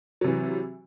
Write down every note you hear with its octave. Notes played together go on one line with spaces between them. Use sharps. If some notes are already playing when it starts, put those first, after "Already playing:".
C3 E3 F#3